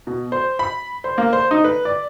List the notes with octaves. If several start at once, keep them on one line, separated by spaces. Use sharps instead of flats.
B2
C5
B5
C5
A#3
C5
D#4
B4
D5